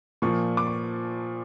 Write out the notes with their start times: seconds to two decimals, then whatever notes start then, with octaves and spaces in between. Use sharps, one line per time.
0.22 A#2 F3 C#6
0.57 D6
0.67 C#6